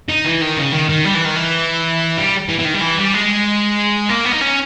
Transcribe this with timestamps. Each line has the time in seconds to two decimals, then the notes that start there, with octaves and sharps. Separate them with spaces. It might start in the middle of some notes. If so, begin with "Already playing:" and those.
0.09 D#4
0.25 E3
0.41 D#3
0.57 C#3
0.72 D#3
0.89 D#3
1.05 G3
1.15 E3
1.25 D#3
1.36 E3
2.18 G3
2.49 E3
2.59 E3
2.65 D#3
2.74 G3
2.81 E3
2.98 G3
3.14 G#3
4.09 A#3
4.25 B3
4.33 D#4
4.41 C#4